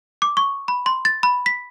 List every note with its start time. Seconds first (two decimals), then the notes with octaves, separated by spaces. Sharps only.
0.22 D6
0.37 C#6
0.68 B5
0.86 C6
1.05 A6
1.23 B5
1.46 B6